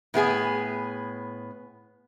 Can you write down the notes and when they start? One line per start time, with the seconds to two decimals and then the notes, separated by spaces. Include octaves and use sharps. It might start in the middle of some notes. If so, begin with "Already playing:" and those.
0.14 A2 B3 G#4 G#5